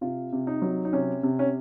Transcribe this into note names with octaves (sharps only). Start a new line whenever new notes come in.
C3 F4
C3
D#4
F#3
D#4
C3 C#4
C3
C#4